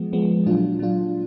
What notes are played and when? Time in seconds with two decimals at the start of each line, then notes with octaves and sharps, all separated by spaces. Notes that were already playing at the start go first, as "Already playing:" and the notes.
Already playing: F3 G#3 B3
0.13 F3 G#3 B3
0.46 A#2 F#3 D4 F4
0.79 A#2 F#3 D4 F4